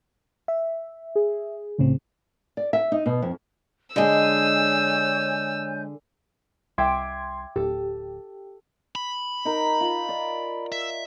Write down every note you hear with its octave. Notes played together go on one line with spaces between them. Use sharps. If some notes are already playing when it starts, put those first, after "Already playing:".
E5
G#4
C2 A2 C#3 C4
D5
E5
D#4
B2
F2
D3 G#3 G#4 C#5 D#5 G#5 E6 G6
C2 E5 G5 C6 D6 G#6
D1 G4 A4
B5
D#4 A#4
F4
D5
E5